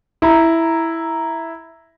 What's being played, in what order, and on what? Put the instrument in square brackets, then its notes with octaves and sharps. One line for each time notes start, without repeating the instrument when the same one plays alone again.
[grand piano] E4 A#5